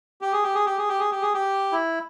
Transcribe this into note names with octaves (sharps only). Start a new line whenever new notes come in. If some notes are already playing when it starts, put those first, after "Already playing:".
G4
G#4
G4
G#4
G4
G#4
G4
G#4
G4
G#4
G4
E4